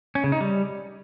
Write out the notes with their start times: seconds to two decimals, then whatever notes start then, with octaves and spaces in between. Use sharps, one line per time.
0.15 C#4
0.24 C#3
0.32 D#4
0.41 G3